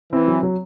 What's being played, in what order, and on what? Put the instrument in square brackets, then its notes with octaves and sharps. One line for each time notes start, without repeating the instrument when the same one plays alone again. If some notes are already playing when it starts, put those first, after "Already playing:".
[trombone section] E3 [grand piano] C4
[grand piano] F#3
F#3